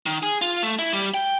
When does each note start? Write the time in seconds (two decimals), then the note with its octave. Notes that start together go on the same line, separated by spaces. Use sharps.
0.06 D#3
0.23 G#4
0.42 F4
0.63 A3
0.79 E4
0.93 G3
1.14 G5